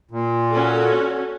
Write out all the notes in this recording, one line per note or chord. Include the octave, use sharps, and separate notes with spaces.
A#2
C#4 F#4 A4